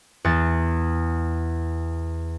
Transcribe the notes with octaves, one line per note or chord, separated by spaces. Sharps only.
E2 A6